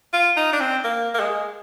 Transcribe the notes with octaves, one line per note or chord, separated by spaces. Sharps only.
F4
D#4
D4
C4
A#3
A#3
G#3